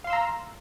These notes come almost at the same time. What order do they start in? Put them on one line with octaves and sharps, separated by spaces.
F5 C6 E6 A#5